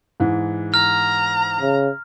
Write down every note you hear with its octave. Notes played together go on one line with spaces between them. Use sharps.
G#2 E3
A#5 F6
C#3